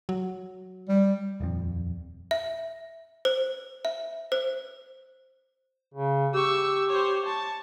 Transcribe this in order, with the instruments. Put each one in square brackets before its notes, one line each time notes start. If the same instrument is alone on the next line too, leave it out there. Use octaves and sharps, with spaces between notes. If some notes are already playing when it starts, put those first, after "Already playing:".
[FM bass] F#3
[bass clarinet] G3
[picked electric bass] D#1 F2
[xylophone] E5
C5
E5
C5
[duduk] C#3
[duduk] G4 [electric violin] C#6 E6
[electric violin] C5 C#5
A5 C#6